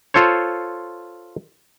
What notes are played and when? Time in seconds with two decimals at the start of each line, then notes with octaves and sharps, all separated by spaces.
0.14 F4 A4 C5 C#5